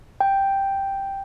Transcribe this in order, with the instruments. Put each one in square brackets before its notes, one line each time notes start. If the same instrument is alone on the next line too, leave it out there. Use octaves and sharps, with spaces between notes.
[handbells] G5